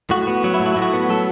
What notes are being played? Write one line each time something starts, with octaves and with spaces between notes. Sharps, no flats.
A2 F#4
B3
F#3 F#4
E4
A2
F#4
A2 E4
F#4
B3
F#3 A4